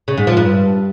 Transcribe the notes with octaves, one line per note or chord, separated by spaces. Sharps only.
C#3
G#2
F3
G2